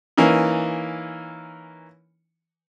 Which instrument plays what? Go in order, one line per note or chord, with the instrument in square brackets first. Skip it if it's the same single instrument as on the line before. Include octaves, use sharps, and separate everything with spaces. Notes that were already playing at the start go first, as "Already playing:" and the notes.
[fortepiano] E3 A#3 C#4 D#4